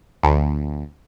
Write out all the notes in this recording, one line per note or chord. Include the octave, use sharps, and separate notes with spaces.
D2